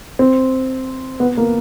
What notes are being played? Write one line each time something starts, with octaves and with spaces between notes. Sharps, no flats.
C4
B3
A#3